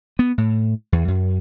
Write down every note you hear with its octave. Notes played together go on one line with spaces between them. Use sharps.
B3
A2
E2
F#2